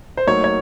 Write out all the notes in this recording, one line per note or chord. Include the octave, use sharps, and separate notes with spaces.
C5
A2 F#3 A#3 D#4 C#5
C#5